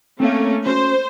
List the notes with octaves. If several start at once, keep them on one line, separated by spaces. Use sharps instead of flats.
A3 A#3 C4 C#4 D#4 F5
C#4 F#4 C5